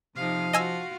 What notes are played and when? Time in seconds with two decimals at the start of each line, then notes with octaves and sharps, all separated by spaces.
0.16 C3 F3 D#4 F5
0.53 F4 F#4 D#5 G#5 E6